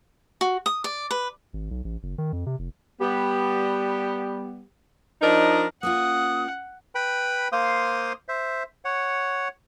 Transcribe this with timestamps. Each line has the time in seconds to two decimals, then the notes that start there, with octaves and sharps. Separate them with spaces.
0.41 F#4
0.66 D#6
0.84 D5
1.11 B4
1.54 G#1
1.71 B1
1.84 A1
2.03 F#1
2.18 D#3
2.33 F2
2.46 C3
2.59 F1
3.00 G3 B3 G4
5.22 F3 D4 D#4 A#4 D5 D#5
5.83 A#3 C#4 F4 F#5 D#6
6.95 B4 G5 B5
7.52 A#3 C5 F5 C6 D#6
8.28 C5 E5
8.85 C#5 F#5